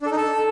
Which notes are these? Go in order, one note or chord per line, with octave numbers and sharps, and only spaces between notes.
D4
A4
D#4
A4